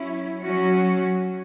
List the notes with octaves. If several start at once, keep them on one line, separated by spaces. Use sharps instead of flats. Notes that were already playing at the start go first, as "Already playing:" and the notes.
Already playing: F#3 C#4 E4
F#3 C#4 F#4